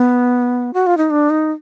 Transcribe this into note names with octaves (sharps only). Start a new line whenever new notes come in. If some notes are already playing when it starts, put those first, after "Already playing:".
Already playing: B3
F#4
F4
D#4
D4
D#4